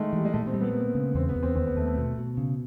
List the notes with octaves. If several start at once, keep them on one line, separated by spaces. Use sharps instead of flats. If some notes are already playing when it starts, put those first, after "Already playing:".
Already playing: D#3 G#3 A3
E3 G3
G#3
A#2 A3
C4
G3
B3
A#3
C#3
E2 C4
B3
E2
C4
D#2 C4
B3
D#2 A3
A3
B2
B2
C#3